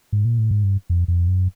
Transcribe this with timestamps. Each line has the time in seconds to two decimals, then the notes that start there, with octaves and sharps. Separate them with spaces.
0.13 G#2
0.25 A#2
0.39 A2
0.51 G#2
0.64 G2
0.90 F2
1.08 F2
1.28 F#2